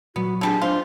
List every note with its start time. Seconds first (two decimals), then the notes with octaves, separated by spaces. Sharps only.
0.16 A#2 F#3 B3 F#4
0.41 D3 E3 G3 D4 G4 G#4 A5
0.61 D4 D#4 F4 C5